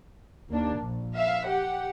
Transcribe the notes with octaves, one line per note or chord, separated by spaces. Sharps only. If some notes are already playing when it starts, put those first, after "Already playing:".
D#2 A#3 D4
A#1
E5 F5
G4 F#5